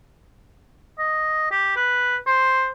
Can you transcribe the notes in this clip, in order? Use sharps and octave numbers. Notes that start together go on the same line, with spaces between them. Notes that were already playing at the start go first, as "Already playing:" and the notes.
D#5
G4
B4
C5